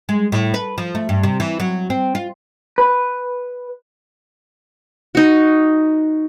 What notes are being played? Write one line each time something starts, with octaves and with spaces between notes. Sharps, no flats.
G#3
A2
B4
F3
A3
G2
C3
E3
F#3
C4
F4
B4
D#4 F#4